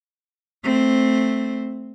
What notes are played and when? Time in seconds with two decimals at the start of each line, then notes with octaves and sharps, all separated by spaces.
0.64 A3 C4